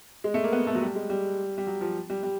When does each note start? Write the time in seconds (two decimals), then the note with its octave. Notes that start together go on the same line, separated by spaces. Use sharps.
0.24 G#3
0.34 A3
0.44 A#3
0.52 B3
0.67 A3
0.75 F#3
0.81 G3
0.95 G#3
1.10 G3
1.58 G3
1.67 F#3
1.81 F3
2.10 G3
2.23 G3